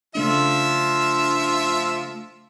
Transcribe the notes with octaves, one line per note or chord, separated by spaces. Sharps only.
C#3 F3 A3 D4 F4 E5